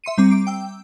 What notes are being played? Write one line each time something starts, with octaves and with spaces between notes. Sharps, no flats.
E5 C6 C#7 D#7
G3 C4 A#5 D6
D6 D7
G5 E6